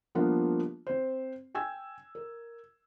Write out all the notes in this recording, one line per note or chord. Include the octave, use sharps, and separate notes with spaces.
F3 G3 A#3 B3 D4 F4
C4 C5
G5 G#5 E6 G#6
A#4